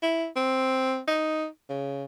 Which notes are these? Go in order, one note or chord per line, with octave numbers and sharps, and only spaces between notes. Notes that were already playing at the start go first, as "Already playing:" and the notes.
E4
C4
D#4
C#3